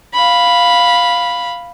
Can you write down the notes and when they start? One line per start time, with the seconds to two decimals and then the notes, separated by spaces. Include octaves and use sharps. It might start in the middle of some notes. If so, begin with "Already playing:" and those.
0.14 F5 B5